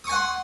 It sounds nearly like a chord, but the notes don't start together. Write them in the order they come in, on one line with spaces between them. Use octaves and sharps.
D#6 C#6 G#5 F#5 C6